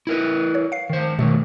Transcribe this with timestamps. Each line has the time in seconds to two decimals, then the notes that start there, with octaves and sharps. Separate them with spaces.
0.07 E4 A#4 B4
0.55 C#5
0.72 F5 C7
0.90 D#3 C5
1.19 B2 D#3 F#3 A3